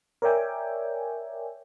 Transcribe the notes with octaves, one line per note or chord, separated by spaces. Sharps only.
A#4 C#5 D5 E5 G5 G#5